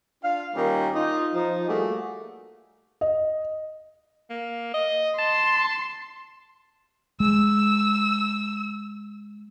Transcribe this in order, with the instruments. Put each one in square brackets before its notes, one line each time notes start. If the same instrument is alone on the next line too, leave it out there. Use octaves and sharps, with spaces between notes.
[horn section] D4 F4 F5
A#2 D#3 G3 A#3 C#4
D#4 F4
F3 D#4
G3 A3 A#3 F#4 G#4
[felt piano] D#5
[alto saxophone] A#3
D#5
[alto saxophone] A5 [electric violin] C6
[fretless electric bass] G#3 [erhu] E6